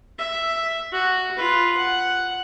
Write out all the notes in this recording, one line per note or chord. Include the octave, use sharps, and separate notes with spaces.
E5
F#4
F4 B4
F#5